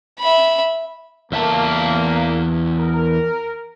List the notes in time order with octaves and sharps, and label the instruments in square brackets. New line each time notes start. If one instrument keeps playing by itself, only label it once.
[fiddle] E5 B5
[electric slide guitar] E2 E5 A5 [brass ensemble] A#3
[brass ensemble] A#4